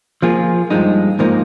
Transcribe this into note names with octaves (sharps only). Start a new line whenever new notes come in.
F3 A#3 F4 G#4
G2 F3 G#3 D#4
G#2 F3 A#3 D#4